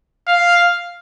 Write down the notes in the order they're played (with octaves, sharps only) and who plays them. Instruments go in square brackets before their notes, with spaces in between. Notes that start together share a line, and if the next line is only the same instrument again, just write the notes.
[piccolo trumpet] F5